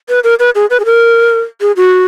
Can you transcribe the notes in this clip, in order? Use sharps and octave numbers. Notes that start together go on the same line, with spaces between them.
B4
A#4
B4
G#4
B4
G#4
A#4
G#4
F#4